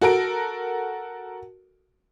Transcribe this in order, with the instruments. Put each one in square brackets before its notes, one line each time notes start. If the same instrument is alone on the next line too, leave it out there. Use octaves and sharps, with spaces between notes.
[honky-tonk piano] F#4 A4 A#4 D7